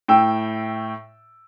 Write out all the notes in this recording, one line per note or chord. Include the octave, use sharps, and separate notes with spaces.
A2 G5 E6